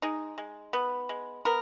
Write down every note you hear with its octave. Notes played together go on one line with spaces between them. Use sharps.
G#3 D#4
G#3
B3
G#3
B3 A#4